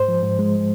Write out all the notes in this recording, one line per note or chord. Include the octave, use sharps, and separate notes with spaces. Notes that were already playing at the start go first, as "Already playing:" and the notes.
Already playing: G#2 C5
F3
G#2
G#3